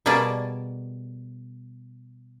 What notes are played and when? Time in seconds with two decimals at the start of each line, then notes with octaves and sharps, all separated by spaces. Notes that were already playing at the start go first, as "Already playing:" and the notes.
0.06 B2 G3 A#3 G#4 D5 A5